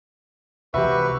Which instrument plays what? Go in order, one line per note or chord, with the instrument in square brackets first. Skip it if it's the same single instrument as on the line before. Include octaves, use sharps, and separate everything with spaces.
[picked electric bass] C#2 C3 E3 [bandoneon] F#4 B4 C#6 [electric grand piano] G4 E5